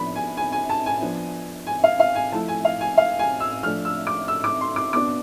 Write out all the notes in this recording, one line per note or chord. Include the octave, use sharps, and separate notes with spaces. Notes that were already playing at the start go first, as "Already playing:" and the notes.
Already playing: F3 B3 D4 B5
G#5
G#5
G#5
A5
G#5
F3 B3 D4
G#5
F5
F5
G#5
F3 A3 E4 A5
G#5
F5
G#5
F5
G#5
E6
F3 A3 D4 F6
E6
D6
E6
D6
C6
D6
B2 B3 D4 D6